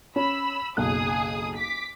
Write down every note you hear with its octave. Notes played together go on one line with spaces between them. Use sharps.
C#4 B5 E6
F#1 B1 G#4 D#6 F#6
D6 B6